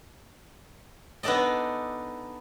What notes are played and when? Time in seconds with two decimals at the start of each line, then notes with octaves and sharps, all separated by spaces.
1.23 B3 D4 D#4 A4 D5 D#5